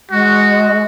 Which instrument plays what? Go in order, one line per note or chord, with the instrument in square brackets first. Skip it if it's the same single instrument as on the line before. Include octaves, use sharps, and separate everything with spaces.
[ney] G#3 [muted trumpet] F#4